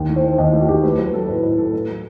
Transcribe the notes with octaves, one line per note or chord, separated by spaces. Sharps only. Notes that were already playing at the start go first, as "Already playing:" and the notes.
Already playing: D#2
A3
C5
D#3
D#2 D#5
A3
F#4
D#2 G4
A3 B4
F#3 B4
F#3 A4
A2 B4
A2 B4
A2 A4
A3 A4
F#3